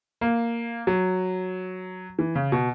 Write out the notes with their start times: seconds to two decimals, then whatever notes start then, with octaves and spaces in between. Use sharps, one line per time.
0.21 A#3
0.87 F#3
2.19 E3
2.35 C#3
2.52 B2